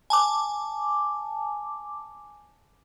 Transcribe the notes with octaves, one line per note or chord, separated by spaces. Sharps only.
G#5 A5 D6